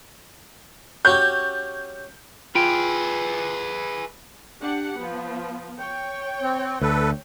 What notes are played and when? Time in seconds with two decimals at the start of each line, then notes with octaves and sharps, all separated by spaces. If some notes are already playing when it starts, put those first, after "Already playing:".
1.05 C#4 F#4 G4 G6
2.55 F4 G#4 B4 G5
4.61 D4 G4 F#5
4.97 F3 B3
5.78 C#5 G5
6.42 C4
6.81 D2 A4 B4